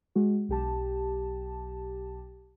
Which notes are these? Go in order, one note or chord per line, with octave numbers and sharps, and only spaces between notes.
G#3 F#4
B1 G4 A5